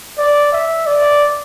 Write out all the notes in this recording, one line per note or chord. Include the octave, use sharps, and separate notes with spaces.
D5
E5
D5